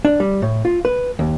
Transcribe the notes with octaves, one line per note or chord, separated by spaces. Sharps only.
D4
G3
A2
F4
B4
D#2